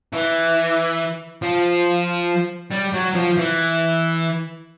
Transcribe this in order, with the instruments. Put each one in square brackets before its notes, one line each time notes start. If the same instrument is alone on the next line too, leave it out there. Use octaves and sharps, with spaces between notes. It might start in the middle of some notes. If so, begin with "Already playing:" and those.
[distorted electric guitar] E3
F3
G3
F#3
F3
E3